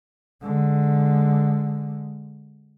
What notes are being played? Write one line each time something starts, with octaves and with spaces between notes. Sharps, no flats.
D3 G#3